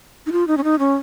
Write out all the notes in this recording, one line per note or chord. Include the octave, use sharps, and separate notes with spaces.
D#4
F4
D#4
C#4
D#4
C#4